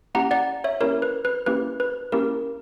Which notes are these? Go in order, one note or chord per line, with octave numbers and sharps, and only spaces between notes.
A#3 C#4 E4 G4 F#5 A#5
D5 F#5
C#5 E5
A#3 C#4 E4 G4 A#4 C#5
B4
B4
A#3 C#4 E4 G4 B4
B4
A#3 C#4 E4 G4 A#4